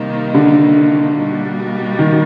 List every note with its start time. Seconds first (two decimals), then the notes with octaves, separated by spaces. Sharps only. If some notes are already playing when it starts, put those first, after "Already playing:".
Already playing: C3 D#3 G3 A#3 D#4
0.34 D3
1.17 B2 G3 A#3 D#4 F#4
1.99 D#3